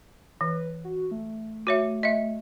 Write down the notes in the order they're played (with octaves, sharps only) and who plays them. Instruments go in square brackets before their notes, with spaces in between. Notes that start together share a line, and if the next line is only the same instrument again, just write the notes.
[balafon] E3 [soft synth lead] B4
[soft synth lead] F#4
A3
[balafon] F#4 C#5 E5
D#5 E5